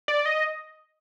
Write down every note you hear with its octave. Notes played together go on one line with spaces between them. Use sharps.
D5
D#5